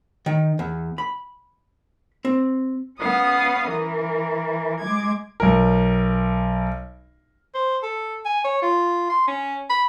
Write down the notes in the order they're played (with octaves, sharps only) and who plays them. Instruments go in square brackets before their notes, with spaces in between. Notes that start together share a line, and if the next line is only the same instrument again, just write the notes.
[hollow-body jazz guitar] D#3
E2
B5
C4
[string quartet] B3 C#4 F5 D#6
E3 A#4
G#3 D6 G#6
[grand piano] B1 A#4
[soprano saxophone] C5
A4
G#5
C#5
F4
C6
C#4
B5